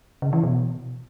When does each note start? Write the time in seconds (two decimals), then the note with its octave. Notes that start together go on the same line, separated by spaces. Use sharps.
0.22 C#3
0.33 E3
0.43 B2